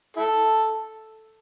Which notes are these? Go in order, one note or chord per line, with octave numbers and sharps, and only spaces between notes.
E4 A4